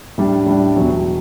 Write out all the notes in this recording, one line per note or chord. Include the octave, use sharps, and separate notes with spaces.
A2 G3 D4
A2 G3 D4
E2 B2 F#3